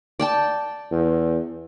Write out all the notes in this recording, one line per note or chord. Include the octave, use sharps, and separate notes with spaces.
D5 G5 A5
E2